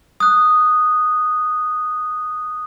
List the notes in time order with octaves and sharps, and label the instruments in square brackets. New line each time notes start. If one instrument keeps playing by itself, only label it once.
[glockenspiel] D#6 F#6